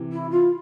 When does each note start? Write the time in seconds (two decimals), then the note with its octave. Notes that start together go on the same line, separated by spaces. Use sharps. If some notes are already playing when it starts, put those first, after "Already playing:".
Already playing: C3 E3
0.12 E4
0.30 F4